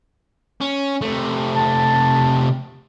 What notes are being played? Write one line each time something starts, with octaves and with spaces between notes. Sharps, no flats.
C#4
C3 A3
A5